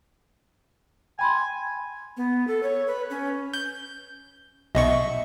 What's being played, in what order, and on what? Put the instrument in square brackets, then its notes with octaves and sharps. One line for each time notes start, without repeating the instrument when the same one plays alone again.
[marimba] G5 B5 C6 [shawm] G#5
[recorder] B3
A4
C#5
B4
C#4
[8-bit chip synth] G6
[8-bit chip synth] B1 B2 C#6 [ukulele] D#5 E5